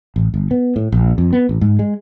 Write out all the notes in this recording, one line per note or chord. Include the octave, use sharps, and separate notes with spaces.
A1
G1
B3
A2
A#1
F2
B3
A1
G#2
G#3